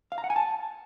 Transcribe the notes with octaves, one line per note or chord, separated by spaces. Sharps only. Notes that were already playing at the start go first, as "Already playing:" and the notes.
F5
A#5
F#5
G#5
A5